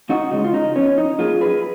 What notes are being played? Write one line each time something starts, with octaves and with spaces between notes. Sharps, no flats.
F2 D#4 F#4
C#3 G#3 D#4
F4
C#3 D#4
F3 B3 C#4
F2 D#4
F3 A#3 F4 G#4
F#2 G#4 B4